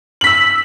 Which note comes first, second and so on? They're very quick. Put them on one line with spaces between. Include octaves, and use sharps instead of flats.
F#7 B6 E6